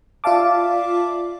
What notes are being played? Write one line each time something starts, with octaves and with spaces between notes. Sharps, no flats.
F4 D5 E5 F5 A5 D6